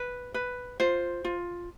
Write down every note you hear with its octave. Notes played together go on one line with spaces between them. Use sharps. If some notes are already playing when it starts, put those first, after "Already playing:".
Already playing: B4
B4
F4 C5
F4